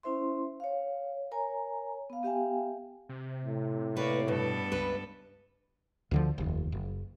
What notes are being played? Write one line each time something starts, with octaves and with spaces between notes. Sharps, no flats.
C#4 E4 C5 E5 C6
C#5 F5
A#4 C#5 G#5 A#5
B3 F5
B3 G4 E5 F5 G5 G#5
C3
A2
A#3 B4 C#5 D5
G2 B2 B3 A4
C#2 B4
D2 D3 F3
F1 D#2
F#1